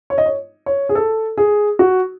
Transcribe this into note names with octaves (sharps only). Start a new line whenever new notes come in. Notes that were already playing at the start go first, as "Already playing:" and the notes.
C#5
D#5
C#5
C#5
G#4
A4
G#4
F#4